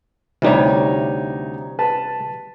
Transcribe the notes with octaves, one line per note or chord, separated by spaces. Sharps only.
D2 C3 E3 G3 D#4 C#5
B4 A5